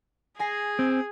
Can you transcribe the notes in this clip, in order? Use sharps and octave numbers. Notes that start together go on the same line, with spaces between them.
G#4 G#5 A#6 C7
C4